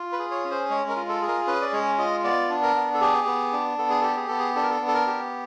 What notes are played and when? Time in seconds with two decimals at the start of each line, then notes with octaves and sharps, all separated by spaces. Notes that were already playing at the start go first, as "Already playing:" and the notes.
Already playing: F4
0.12 B4
0.19 G#4
0.31 C#5
0.44 C#4
0.51 C5
0.70 G#3 C#5
0.89 A#4
0.96 F4
1.09 A4
1.22 G#4
1.28 A#4
1.47 C#4 B4
1.62 D5
1.72 G#3 C#5
1.98 F4 D#5
2.24 B3 D5
2.50 D4
2.62 A#4
2.76 B3
2.94 A4
3.01 G4 G#4
3.27 B3
3.53 D4
3.78 B3 A4
3.90 G#4
4.01 G4 A4
4.17 G#4
4.28 B3 A4
4.38 G#4
4.56 D4 A4
4.63 A#4
4.71 A4
4.81 B3
4.88 A4
4.94 A#4
5.07 G4